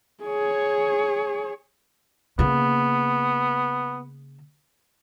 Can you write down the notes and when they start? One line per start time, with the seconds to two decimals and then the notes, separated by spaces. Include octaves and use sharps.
0.24 G#4 C#5
2.39 C#3 A#3 B3